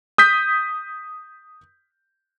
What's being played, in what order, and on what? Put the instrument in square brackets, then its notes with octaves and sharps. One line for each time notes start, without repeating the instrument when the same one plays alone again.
[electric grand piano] D#6 G6 B6